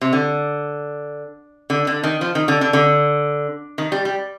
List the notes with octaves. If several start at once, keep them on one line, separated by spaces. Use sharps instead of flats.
C3
D3
D3
D3
D#3
F3
D#3
D3
D3
D3
D#3
G3
G3